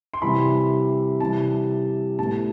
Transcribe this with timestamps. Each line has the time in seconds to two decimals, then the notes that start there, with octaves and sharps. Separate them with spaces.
0.14 C6
0.22 C3 E3 G3 B5
1.20 C3 E3 G3 A5
2.19 A2 G3 B3 A5